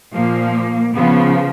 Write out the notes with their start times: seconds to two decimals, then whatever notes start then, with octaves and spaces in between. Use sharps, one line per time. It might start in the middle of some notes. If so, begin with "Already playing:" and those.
0.14 A#2 F3 A#3
0.94 C#3 F3 B3